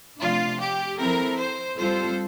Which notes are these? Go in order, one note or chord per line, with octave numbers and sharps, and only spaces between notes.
C3 F3 A3 D4 F4
G4
F3 C4 E4 A4 A#4
C5
G3 C4 F4 A4 C5